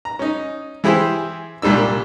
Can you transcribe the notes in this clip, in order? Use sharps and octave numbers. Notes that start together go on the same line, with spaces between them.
A#5
C#4 D#4
E3 E4 G4 G#4 C5
C2 A#2 G3 D4 E6